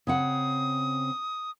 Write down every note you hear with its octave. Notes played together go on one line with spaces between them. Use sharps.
C#3 C4 F#5 D#6